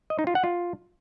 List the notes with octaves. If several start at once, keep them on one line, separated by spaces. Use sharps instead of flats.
D#5
D#4
F4
F#5
F4